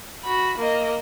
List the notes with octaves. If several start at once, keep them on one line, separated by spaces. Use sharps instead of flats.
F#4 B5
A#3 D#5